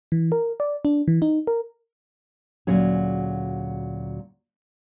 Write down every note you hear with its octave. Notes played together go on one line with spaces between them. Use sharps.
E3
A#4
D5
D4
E3
D#4
A#4
D2 A#2 F#3 C#4 G#4